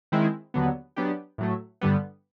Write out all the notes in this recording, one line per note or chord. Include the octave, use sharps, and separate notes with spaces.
D#3 G#3 C4 E4
D#2 D3 F#3 B3
F#3 B3 D4 G4
A2 F#3 A3
G2 D3 G3 B3